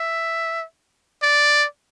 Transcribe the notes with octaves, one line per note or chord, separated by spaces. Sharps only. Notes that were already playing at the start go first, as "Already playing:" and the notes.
Already playing: E5
D5